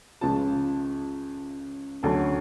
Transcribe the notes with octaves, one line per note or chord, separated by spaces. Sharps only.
C#2 C#3 F3 A5
D2 D3 F#3 C#4 A5